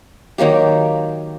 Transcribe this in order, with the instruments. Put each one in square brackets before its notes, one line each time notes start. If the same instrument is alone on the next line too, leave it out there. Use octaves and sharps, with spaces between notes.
[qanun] D#3 F#3 A#3 G4